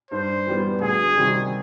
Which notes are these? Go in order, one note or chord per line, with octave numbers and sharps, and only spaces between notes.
G2 C5
E3 G3 B3
D2 G#4
C3 D#3 G3 C4